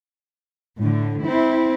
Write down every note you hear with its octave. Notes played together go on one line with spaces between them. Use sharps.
A2 D3
C4 E4